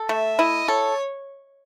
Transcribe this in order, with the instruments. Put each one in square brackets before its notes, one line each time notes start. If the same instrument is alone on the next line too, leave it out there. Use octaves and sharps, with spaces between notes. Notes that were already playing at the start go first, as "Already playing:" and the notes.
Already playing: [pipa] A4
[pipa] A3 [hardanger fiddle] E5
[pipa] E4 [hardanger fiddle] D#5
[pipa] A4 [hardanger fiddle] C#5